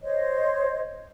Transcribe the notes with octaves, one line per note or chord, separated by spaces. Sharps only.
C5 C#5 D#5